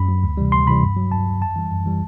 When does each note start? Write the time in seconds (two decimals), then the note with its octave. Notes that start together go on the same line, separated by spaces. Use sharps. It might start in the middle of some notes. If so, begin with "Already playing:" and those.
Already playing: F#2 B5
0.08 F#3
0.23 D2
0.37 C3 E3 G3
0.52 D2 C6
0.67 C3 E3 G3 B5
0.83 G2
0.97 F#3
1.12 G2 A5
1.26 F#3
1.42 F#2 A5
1.56 E3 G3
1.71 F#2
1.86 E3 G3